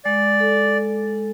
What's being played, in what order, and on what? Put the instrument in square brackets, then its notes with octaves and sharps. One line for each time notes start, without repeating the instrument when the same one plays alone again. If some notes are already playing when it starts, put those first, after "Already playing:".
[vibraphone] G#3 [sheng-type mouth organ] D5
[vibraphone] A4